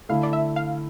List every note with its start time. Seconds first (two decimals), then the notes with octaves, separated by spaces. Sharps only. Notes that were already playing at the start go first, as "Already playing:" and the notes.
0.09 D3 A3 E4 F5
0.23 D5
0.33 E5
0.56 F5